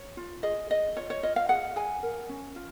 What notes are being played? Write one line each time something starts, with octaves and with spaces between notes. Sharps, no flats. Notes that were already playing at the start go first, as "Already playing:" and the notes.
Already playing: C#5
F4
G#4 D#5
G#4 D#5
F4 C#5
C#5
F4 D#5
F5
G#4 F#5
G#4 G#5
A#4
C#4
F4